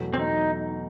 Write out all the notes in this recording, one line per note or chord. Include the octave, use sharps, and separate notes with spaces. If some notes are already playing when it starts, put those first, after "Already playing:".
Already playing: E2 B2 F#3 A3
C4
D#4